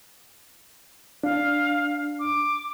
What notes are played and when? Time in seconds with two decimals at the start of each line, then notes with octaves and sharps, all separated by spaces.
1.24 D4 F5
2.19 D6